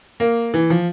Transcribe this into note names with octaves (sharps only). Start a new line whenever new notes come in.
A#3
E3
F3